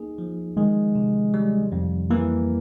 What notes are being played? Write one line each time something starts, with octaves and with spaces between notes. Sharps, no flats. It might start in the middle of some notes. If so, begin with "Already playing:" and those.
Already playing: A#3 D#4 G#4
F3
D#3 G#3
C3
G3
F2
E3 A#3